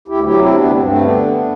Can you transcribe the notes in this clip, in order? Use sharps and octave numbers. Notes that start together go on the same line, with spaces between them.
D2 E4 G4
F#3 E4 G4
C3 C4 E4
D2 B3 D4
G2 C4
A3 C4
D3 B3 D4
G2